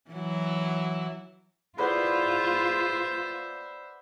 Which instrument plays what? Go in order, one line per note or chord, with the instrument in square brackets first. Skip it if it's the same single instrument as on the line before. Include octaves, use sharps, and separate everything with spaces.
[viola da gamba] E3 F#3 E4
[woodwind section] E4 G#4 [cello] F4 [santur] B4 D5 F#5 [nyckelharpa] C5 E5